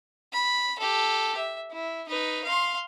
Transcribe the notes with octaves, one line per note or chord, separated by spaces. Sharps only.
B5
G4 A4
E5
E4
D#4 B4
F5 C6